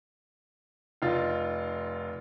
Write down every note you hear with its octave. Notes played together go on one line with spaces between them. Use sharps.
F1 D#4 F4 F5 A6